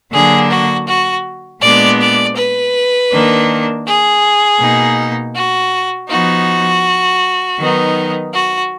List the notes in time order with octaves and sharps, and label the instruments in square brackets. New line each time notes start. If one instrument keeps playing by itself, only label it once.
[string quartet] D3 F#3 A#3 D4 G#4
F#4
F#4
A#2 G#3 B3 D4 D5
D5
B4
D#3 A#3 D4
G#4
B2 A#3 D#4
F#4
F3 B3 D#4 F#4
D#3 F#3 B3 D#4
F#4